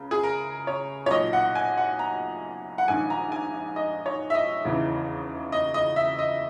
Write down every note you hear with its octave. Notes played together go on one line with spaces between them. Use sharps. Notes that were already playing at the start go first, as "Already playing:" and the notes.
Already playing: C#2 C#3
G#4
A#4
C#5
C#5
B1 A#2 D#5
F#5
G#5
F#5
A#5
F#5
A#1 G#2 D#3 G#5
A#5
G#5
D#5
C#5
E5
D#5
E1 D#2 C#3 E3
D#5
D#5
E5
D#5